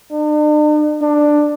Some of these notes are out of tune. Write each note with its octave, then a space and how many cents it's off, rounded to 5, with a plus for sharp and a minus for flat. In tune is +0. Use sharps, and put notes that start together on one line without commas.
D4 +45
D4 +10